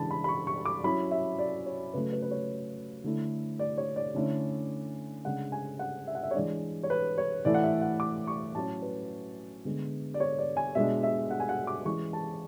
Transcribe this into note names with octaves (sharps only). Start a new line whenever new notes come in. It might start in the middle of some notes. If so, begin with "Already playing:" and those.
Already playing: C#3 E3 G#3 D4 A5 B5
B5
B5
C#6
C#6
D6
F#3 C#4 E4 B5
E5
D5
C#5
C#3 F#3 A3 B4
B4
B4
C#5
D3 A3 E4
D5
C#5
D5
D3 A3 C#4 E4
C#3 G#3 D4 F#5
G#5
F#5
E5
F#5
E5
C#5
E3 G#3 D4 D5
C#5
B4
C#5
A2 E3 A3 E4 D5
F#5
E5
F#5
D6
C#6
A2 F#3 C#4 A5
B4
D3 G#3 B3
D5
C#5
D5
G#5
B2 G#3 D4 E5
E5
F#5
G#5
F#5
D6
E3 G#3 C#4 E4 C#6
A5